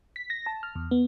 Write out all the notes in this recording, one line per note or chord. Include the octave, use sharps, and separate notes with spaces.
B6
A#6
A5
F6
E2
B3